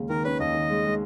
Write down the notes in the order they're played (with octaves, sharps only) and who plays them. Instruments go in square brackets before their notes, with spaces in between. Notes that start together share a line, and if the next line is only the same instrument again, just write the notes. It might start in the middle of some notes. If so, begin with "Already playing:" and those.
Already playing: [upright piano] D#2 C#3 G#3
[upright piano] D#3 [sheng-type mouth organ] A#4
[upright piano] C#4 [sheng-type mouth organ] B4
[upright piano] D#2 [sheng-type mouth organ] D#5
[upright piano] D#3
G#3
G#3